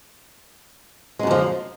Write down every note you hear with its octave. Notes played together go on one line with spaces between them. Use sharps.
F#2 D3 F3 G#3